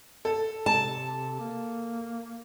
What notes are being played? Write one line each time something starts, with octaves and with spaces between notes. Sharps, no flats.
A4
C3 A5
A#3